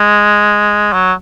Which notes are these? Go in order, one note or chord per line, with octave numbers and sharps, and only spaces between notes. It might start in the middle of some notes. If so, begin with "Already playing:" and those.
Already playing: G#3
F#3